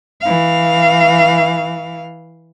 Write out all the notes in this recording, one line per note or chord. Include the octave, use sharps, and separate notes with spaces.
E3 F5